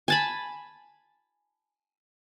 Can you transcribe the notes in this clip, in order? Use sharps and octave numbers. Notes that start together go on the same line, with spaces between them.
G#5 A5 B5